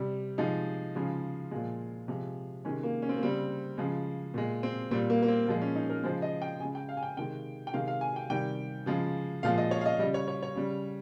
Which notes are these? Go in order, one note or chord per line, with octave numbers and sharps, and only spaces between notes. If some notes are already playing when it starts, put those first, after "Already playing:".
Already playing: C3 G3
C3 F3 G#3 D#4
C#3 F3 G#3
A#2 F3 G#3
C3 F3 G#3
C3 D#3 G#3 C#4
A#3
C#4
C4
A#3
C#3 G3 C4
C#3 F3 G#3
A#2 G#3
C4
A#2 G3 C4
A#3
A#3
C4
A#2 F3 G#3 A#3
C#4
D#4
A#4
C#3 F3 G#3 C5
D#5
G5
C#3 G#3 G#5
G5
F5
G#5
G5
C3 D#3 G#3 G5
G5
C3 D#3 G#3 F5
F5
G#5
G5
C3 D#3 G3 G5
C#3 F3 G#3
A#2 F3 G#3 F5
D#5
C#5
F5
D#5
C#3 G3 D#5
C#5
C#5
C#5
C#3 G3